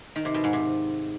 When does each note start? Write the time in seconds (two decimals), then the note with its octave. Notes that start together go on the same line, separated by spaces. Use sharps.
0.16 D#3
0.25 C3
0.34 B2
0.44 G#2
0.53 C3